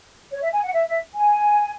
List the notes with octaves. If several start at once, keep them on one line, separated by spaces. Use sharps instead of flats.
C#5
E5
G#5
F#5
E5
E5
G#5